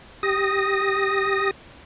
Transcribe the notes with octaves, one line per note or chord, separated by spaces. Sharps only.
G4 D#6 A#6